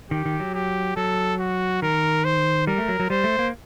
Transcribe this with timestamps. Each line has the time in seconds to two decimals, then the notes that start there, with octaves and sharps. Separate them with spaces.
0.11 D#3 G4
0.25 D#3
0.40 F#3
0.54 G4
0.96 F#3 A4
1.40 F#4
1.82 D#3 A#4
2.24 C5
2.67 G3 A#4
2.78 A3
2.89 F#3
3.00 F#3
3.10 G3 C5
3.24 A3
3.39 A#3